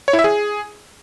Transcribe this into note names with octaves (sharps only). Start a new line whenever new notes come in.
C#5
E4
E5
G#4